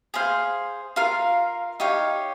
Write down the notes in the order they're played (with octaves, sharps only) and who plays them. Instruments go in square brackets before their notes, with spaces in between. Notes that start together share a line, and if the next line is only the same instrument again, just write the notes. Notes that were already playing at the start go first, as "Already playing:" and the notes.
[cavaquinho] G#4 C5 F5
F4 A#4 F5
D#4 G4 C#5 F5